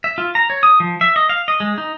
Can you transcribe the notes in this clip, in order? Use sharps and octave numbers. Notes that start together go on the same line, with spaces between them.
E5
F4
A#5
C#5
D#6
F3
E5
D#5
F5
D#5
G#3
D#4